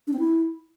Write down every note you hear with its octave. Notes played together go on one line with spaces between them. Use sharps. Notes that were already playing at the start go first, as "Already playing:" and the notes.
D4
C4
E4